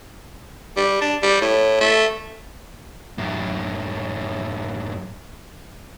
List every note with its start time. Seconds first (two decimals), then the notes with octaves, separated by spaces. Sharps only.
0.76 G3
1.01 D4
1.22 G3
1.41 A2
1.80 A3
3.18 F#2 A2